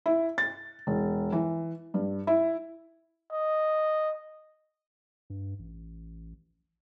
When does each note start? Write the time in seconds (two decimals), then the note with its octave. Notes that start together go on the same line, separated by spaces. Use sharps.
0.06 E4
0.38 A6
0.87 E1
1.32 E3
1.94 G2
2.27 E4
3.32 D#5
5.30 G2
5.59 A1